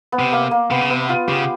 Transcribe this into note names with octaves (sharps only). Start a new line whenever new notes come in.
B3
C3
A#3
A#3
C3 B3
C#3
C3 B3
F4
C#3 G4